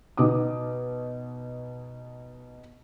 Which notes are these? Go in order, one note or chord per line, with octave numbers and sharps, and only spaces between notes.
B2 D#4 D6 D#6